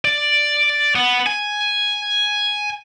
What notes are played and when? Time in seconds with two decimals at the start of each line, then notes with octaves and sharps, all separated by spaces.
0.05 D5
0.95 B3
1.26 G#5